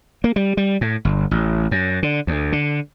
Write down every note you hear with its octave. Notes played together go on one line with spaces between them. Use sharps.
A#3
G3
G3
A2
G1
A1
F#2
D3
D2
D3